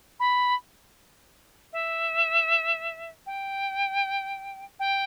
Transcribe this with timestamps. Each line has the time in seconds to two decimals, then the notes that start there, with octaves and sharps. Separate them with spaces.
0.19 B5
1.73 E5
3.26 G5
4.79 G5